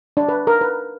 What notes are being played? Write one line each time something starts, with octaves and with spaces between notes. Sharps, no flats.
D4
B4
A#4
B4